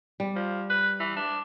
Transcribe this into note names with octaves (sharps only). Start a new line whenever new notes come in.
G3
F3
B4
E3
D4